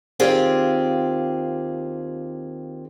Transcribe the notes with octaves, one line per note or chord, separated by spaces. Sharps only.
D#2 C4 F4 G4 G#4 D5